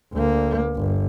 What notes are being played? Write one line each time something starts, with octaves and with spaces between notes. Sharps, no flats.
D2 A#3
G1